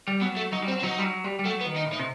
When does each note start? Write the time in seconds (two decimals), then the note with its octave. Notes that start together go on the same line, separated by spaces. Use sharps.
0.08 G3
0.22 B2 F#3
0.37 A3
0.52 F#3 D#4
0.62 G3
0.68 C4
0.72 F#3
0.79 C4
0.83 F#3 D#4
0.99 G3
1.04 F#3
1.24 G3
1.39 G3
1.45 F#3 A3
1.61 B3
1.66 D#3
1.76 D#4
1.86 A2
1.92 D#4
1.99 C3